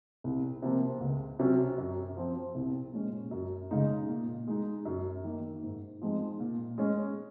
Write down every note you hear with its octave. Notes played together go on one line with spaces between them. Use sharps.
C2
C3 F3 A#3
C#2
C3 F#3 C#4
F#2
F3 C4
C2
A#2 G#3 C#4
F#2
C#3 G#3 D#4
A#2
G#3 D#4
F#2
D#3 A#3 D#4
G#2
F3 G#3 C4 D#4
A#2
G#3 C#4